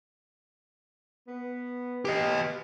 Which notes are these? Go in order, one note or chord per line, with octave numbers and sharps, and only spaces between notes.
B3
B3 G4 D#5